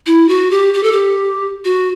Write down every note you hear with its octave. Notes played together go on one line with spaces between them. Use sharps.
E4
F#4
G4
G4
A4
G4
F#4